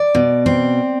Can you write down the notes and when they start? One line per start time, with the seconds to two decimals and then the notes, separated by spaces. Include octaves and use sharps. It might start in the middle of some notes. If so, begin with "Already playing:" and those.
Already playing: D5
0.15 B2
0.46 C4